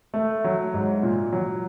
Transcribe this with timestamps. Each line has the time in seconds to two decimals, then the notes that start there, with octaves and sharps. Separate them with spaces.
0.14 A3
0.44 F#3
0.74 G#2
1.03 A#2
1.33 F#3